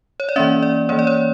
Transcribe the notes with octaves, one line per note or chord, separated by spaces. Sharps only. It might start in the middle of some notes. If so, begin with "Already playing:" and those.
C#5
D5
E3 A#3 C#4 E5
D5
E3 A#3 C#4 C#5
D5
C#5